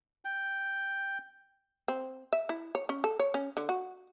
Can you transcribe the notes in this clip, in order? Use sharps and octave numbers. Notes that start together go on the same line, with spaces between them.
G5
C4
E5
E4
C#5
C#4
A4
C#5
C#4
D3
F#4